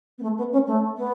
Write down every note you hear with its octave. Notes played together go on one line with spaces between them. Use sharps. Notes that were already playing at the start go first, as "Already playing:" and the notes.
B3
A3
B3
C#4
A3
B3